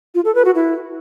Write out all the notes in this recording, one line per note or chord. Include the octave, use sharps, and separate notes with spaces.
F4
A4
B4
F#4
E4